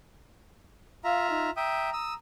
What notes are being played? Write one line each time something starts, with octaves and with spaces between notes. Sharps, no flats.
F4 E5 F5 A#5
D#4
E5 G5 A#5 D#6
D#6 E6